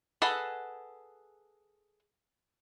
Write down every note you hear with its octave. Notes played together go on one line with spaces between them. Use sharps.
G#4 A4 B4 D#5 F#5